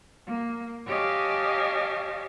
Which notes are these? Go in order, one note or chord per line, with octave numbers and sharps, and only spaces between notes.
A#3
G4 C#5 D#5 F5 G#5 A5